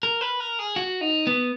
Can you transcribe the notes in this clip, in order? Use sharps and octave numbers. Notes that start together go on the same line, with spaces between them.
A#4
B4
A#4
G#4
F#4
D#4
B3